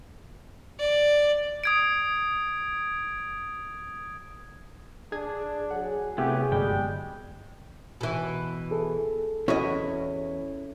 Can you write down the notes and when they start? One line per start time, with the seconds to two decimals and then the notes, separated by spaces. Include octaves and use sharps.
0.79 D5
1.64 D#6 G#6 D7
5.12 D4 G#4 G#6
5.71 F#3 G#4 F#5
6.18 C3 A3 B3 E4 G4
6.52 G1 G3 G#3 G5
8.01 B2 E3
8.71 G#4 A4
9.48 E2 C#4 E4 F#4 C#5 D#5